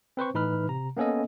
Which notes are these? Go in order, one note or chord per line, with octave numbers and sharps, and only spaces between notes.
C4 B4 C5 C#6
A2 E3 D#4 B4 B5 F6
C3 A#5
A#3 B3 C#4 A4 D#5